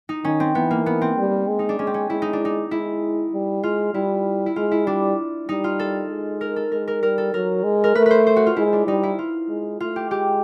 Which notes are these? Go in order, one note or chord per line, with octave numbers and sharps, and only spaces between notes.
D#4
D#3 C#4
C4
E3 B3
A#3
B3
C4
G3
G#3
D#4
D4
G#3 C#4
C4
C#4
G#3 E4
D#4
D4
D#4
G#3 E4
G3
G#3 F4
G3 E4
E4
G#3 F4
E4
G3 D4
G3 D#4
F4
A4
G#3
A#4
A4
G#3 A#4
A#4
G3 A#4
A4
F#3 A#4
G#3
A#4
A3 B4
B4 C5
C5
F#4
F4
G#3 E4
D4
G3 D#4
E4
F4
G#3
A3 F4
G4
G#3 G4